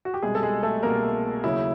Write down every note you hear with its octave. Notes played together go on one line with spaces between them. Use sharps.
F#4
G4
C2 B2 G3 G#3 G#4
A4
G#3 G#4
A3 A4
C2 B2 G3 A#3 A#4
D#2 C#3 F#3 E4